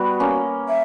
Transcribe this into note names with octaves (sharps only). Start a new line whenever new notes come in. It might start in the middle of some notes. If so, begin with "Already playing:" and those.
Already playing: G3 B3 F#4
A#3 C#4
E5